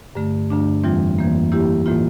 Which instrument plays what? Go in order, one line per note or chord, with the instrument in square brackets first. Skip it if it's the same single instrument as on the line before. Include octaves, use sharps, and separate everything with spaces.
[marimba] G2 D3 A3
G2 D3 A3 D4
F2 E3 G3 C4 F4
F2 E3 A#3
E3 A#3 E4 G4
A2 E3 A#3 F4